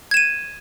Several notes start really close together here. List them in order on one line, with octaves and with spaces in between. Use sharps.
G#6 E7 D#7